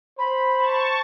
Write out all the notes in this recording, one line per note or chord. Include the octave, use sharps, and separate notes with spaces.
C5 B5
A5 C#6